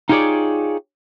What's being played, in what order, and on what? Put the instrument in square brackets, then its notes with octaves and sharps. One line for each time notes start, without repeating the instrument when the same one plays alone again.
[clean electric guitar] D#4 F4 G4 G#4 C#5 D5